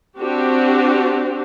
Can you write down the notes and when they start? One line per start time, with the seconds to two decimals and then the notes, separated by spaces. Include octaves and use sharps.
0.19 C4 D4 F#4 G4